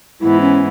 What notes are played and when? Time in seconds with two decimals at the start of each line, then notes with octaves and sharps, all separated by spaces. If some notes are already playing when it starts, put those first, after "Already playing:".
0.21 G#2 E3 B3 E4
0.41 C#4